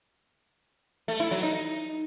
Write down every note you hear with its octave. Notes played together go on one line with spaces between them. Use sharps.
A3
E4
F#3
D#4